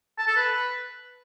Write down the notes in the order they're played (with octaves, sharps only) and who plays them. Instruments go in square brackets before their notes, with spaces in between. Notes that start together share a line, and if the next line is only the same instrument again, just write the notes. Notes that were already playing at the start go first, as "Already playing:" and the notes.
[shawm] A5
A4
B4